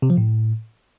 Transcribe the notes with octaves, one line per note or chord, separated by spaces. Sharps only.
C3
F3
A2